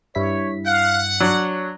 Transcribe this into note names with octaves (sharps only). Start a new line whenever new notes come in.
G2 E4 C#5 B6
F5 F#5
F#3 D4 C#5